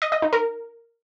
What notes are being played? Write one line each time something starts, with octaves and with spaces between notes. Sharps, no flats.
D#5
D#5
D#4
A#4